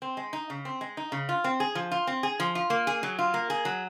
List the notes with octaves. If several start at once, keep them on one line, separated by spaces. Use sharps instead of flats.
C4
G#3
D#4
C#3
C4
G#3
D#4
C#3
F4
C4
G#4
F3
F4
C4
G#4
F3
F4
A#3
G#4
F#3
F4
A#3
G#4
F#3